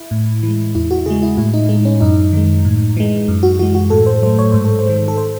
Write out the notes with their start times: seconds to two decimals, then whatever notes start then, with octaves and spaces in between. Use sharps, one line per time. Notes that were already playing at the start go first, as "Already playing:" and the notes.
Already playing: E4
0.11 A2
0.43 E3
0.48 G#3
0.75 E2 E4
0.91 F#4
1.06 C#3 G#3 G#4
1.23 E4
1.37 A2 E4
1.54 D#4
1.69 G#3 D#4
1.85 C#4
2.00 F#2 D#4
2.33 D#3 G#3
2.65 A2
2.97 E3 G#3
3.28 F#2
3.43 F#4
3.59 E3 G#3 F#4
3.74 F#4
3.90 A2 A4
4.06 C5
4.22 F#3 A3 C5
4.39 C#5
4.52 G#2 C5
4.64 A4
4.79 C5
4.86 D#3 G#3
5.08 A4
5.17 C5